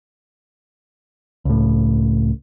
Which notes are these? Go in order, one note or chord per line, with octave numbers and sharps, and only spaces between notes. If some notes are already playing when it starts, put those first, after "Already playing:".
C#2 A2